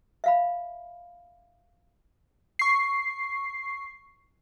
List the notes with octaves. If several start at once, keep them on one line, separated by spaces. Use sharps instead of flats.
E5 F5 B5
C#6 C7